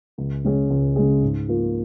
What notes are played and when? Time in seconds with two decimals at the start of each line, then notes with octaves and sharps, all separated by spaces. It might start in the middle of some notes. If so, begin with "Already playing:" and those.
0.18 C#2
0.44 C#3 G#3 C#4 G#4
0.70 C#2
0.96 C#3 G#3 C#4 G#4
1.22 G#2
1.48 F3 A#3 F4